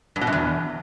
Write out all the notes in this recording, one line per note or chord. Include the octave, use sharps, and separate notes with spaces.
G2
B2
F#2
E2